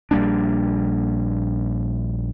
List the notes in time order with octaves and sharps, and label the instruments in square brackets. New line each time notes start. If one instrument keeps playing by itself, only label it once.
[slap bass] A#1 G3 A#3 D4